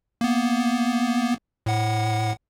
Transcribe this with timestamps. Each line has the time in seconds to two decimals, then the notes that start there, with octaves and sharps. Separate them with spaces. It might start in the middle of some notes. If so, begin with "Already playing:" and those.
0.21 A#3 B3
1.66 A2 F#5